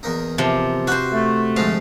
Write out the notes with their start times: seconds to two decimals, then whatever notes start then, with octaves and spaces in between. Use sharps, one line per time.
0.03 E2 A#3 D#4
0.38 C3 F3
0.87 F#4 B4 C5 F5 C6
1.12 A3
1.56 G#2 D3 F3 F5